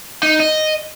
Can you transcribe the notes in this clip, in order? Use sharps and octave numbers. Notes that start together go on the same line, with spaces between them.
D#4
D#5